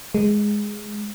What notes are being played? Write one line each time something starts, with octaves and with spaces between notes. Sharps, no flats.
G#3